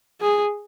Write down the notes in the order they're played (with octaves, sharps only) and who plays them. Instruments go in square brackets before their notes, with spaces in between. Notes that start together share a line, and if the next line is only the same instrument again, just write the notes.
[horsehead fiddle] G#4